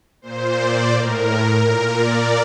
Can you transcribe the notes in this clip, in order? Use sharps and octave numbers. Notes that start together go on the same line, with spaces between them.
A#2 C5
D5
A2 A#4
A#2 A#4
D5